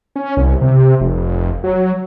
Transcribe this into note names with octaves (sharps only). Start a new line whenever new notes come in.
C#4
C2
C3
F1
F#3